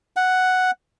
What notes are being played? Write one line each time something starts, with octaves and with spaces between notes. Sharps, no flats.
F#5